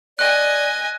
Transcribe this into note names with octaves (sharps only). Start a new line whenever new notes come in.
D5 D#5 G#5 F#6